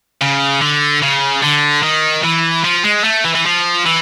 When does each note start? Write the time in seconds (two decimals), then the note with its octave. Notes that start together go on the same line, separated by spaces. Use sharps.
0.21 C#3
0.62 D3
1.02 C#3
1.43 D3
1.83 D#3
2.24 E3
2.64 F3
2.84 G#3
3.04 A3
3.25 E3
3.35 E3
3.46 F3
3.86 E3